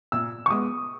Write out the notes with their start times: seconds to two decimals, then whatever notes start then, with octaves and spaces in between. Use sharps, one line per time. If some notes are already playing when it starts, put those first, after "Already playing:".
0.12 A#2 E6
0.46 C#6
0.50 G#3 B3 D#6